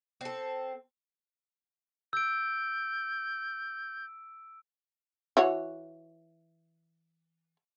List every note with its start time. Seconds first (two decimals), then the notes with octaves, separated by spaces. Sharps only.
0.21 C4 A4
2.13 E6 G6 D7
5.37 E3 F#4 C#5